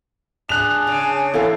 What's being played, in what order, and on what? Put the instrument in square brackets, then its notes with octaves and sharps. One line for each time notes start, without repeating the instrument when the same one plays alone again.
[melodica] D4 G#4 [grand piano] F#6 F7
[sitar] C#3
[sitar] E2 A2 [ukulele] E4 A4 F5